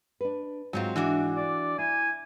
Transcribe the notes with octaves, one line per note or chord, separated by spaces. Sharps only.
D4 B4
G#2 F#3 C4 F4
E3 D4 F#4
D5
E4 G#5